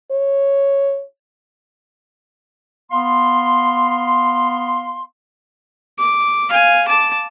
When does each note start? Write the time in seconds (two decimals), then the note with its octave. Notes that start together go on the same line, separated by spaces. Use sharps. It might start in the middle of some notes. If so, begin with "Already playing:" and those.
0.11 C#5
2.91 B3 F5 C6
5.99 D6
6.50 F5 G#5
6.88 A5 D6